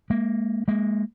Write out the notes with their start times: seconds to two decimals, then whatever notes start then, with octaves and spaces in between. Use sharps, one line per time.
0.10 G#3 A#3
0.68 G#3 A#3